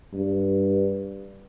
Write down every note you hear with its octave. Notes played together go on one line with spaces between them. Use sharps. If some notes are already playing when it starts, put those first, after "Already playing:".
G2